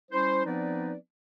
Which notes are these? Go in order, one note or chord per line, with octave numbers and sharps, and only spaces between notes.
G3 C#4 E4 C5
F3 B3 C4 D#4 B4 D5